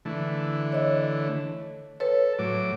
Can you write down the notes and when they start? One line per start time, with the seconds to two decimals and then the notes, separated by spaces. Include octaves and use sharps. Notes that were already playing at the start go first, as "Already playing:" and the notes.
0.05 D3 E3 A3
0.72 C#5 D#5
2.00 A4 B4 C#5
2.39 A2 F#3 D6